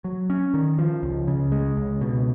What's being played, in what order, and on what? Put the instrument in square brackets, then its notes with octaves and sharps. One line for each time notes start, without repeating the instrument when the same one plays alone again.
[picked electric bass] F#3
C#4
D#3
F3
C#2
C#3
G#3
C#2
B2